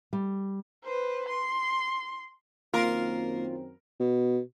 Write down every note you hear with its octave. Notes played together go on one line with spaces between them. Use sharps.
G3
B4 C5
C6
F#2 D#3 A#3 C4 F4 A#4 C6
B2